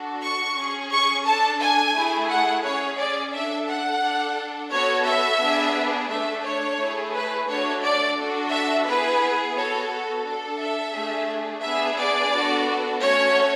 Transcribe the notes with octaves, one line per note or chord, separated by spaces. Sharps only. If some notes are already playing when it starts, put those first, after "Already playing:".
Already playing: D4 F#4 A4
C#6
C#4 G#4
C#6
D4 A4 A5
G#5
A3 E4 G#4
F#5
C#4 G#4 C#5
D5
D4 A4 E5
F#5
D4 A4
B3 F#4 A4 C#5
E5
B3 D4 G#4
A3 D4 A4 E5
C#5
A3 E4 G#4
B4
A3 D4 F#4 A4 C#5
D5
D4 F#4 A4
E5
B3 E4 G#4 B4
B3 F#4 A4 C#5
D4 A4
E5
A3 D4 G#4
B3 D4 G#4 E5
D5
B3 D4 F#4 A4
A3 C#4 F#4 A4 C#5